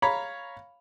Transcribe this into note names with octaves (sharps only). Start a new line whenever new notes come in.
C#5 F5 A#5 B5